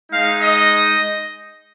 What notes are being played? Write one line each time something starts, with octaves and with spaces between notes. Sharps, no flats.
G#3 D#4 F5
D#5